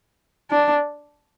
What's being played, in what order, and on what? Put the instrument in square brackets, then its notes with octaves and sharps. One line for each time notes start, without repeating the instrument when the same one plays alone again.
[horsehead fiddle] D4